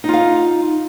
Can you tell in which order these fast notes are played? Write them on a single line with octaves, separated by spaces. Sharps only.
D#4 F4 F5